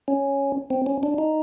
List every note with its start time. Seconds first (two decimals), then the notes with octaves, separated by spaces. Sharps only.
0.08 C#4
0.70 C4
0.86 C#4
1.03 D4
1.18 D#4